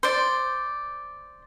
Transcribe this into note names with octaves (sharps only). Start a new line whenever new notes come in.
C5 D5